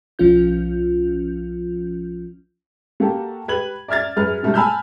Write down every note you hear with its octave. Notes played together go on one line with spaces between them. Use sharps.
B1 F3 C#4 F4 G6
A#3 F#4 G4 A4
G4 B4 G#6 F#7
D5 E5 F6 G#6 A6
F#2 G#4 B4 F6
G#2 B2 F#3 G3 A3
G#5 A5 B5 E6 F6 G6